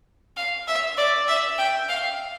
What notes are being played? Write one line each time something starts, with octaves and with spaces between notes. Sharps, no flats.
F5
E5
D5
E5
G5
F5